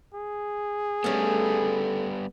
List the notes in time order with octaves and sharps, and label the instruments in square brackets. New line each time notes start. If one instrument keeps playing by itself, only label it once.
[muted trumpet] G#4
[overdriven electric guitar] G3 B3 [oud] A3 C#4